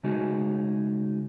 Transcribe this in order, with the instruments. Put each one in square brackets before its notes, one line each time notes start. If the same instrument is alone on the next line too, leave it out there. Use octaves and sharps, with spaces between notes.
[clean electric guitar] C#3 G#3 A3 D#4 F#4 G#4